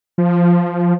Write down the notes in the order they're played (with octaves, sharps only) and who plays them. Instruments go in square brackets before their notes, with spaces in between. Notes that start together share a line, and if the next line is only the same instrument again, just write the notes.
[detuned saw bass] F3